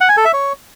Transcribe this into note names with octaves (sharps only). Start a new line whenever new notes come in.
F#5
G#5
A4
E5
C#5